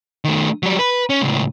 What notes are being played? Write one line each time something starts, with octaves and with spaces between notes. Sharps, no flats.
D#3 A3
F#3 G3
B4
C#4
C#2 A2